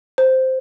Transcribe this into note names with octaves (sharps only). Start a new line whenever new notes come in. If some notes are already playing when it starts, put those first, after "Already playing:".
C5